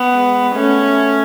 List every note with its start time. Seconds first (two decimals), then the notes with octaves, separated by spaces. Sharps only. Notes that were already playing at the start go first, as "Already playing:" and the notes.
Already playing: B3
0.14 G#3
0.55 A3 C#4